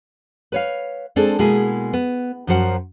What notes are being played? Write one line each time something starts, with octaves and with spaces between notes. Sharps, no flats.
B4 C#5 F5
G#3 C4 D4 G#4 A4
B2 G#3 A#3 E4 G#4
B3
F#2 F3 F#3 C#4 C5 F#5